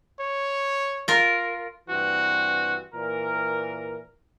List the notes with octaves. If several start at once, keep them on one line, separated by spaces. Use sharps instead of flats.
C#5
F4 A#4
G2 E3 C4 F#4
A#2 E3 A#4